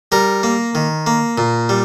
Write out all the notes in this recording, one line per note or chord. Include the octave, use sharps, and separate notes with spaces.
G3 A#4
A#3
D#3
A#3
A#2
G3